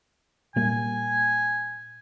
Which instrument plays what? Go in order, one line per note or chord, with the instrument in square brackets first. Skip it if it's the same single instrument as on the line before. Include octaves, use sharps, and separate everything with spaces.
[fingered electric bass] A#2 G3 A#3 [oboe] G#5